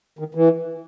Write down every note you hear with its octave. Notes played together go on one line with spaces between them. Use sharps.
D#3
E3